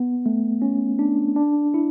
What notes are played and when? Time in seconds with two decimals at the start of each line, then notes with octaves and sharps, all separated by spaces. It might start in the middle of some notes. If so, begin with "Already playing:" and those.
Already playing: B3
0.26 A3
0.62 C#4
0.99 D4
1.36 D4
1.74 E4